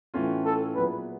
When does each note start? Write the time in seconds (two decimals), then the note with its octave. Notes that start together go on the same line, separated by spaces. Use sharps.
0.14 A2 E3 A3 C#4 F4
0.45 A4
0.75 A#2 F#3 B3 E4 G#4 B4